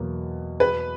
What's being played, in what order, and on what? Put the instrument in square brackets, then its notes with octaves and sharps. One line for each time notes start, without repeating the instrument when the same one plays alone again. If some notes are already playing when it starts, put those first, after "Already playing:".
Already playing: [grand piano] E2 B2 F#3 A#3
[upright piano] B4